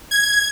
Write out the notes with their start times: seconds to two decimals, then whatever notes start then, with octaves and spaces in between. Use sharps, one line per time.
0.11 G#6